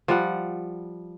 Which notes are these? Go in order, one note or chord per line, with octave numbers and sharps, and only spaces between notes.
F3 G3 F#5